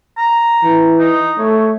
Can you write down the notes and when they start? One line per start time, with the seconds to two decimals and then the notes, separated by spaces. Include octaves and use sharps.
0.18 A#5
0.64 E3
1.00 D#4
1.39 A3 C#5